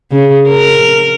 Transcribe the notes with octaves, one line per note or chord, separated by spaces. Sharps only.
C#3
A#4